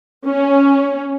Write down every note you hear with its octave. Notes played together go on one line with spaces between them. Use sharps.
C#4